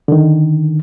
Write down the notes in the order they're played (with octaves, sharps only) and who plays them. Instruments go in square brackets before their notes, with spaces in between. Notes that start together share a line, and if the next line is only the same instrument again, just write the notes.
[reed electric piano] D3 D#3